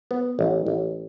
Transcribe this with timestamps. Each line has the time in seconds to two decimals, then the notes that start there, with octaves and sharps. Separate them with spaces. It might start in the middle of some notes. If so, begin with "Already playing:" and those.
0.11 B3
0.39 A1
0.66 A1